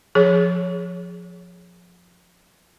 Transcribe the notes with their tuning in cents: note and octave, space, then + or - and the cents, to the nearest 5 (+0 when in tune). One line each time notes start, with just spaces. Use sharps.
F3 +20 G#4 +0 C#5 +5